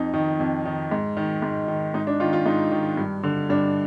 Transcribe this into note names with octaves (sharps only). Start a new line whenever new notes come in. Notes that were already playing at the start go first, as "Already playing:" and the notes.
Already playing: F2 D#4
D#3
F2
D#3
G#2
D#3
G#2
D#3
G#2 D#4
D4
D#3 F4
F4
G#2 D#4
D#3
G2
D3
G2 D4